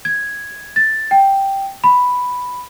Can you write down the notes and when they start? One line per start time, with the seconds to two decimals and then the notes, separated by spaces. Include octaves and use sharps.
0.05 G#6
0.76 A6
1.11 G5
1.84 B5